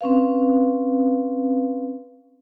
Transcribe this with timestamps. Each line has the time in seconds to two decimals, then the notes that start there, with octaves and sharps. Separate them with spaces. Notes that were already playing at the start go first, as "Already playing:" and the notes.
0.01 C4 C#4 B4 F5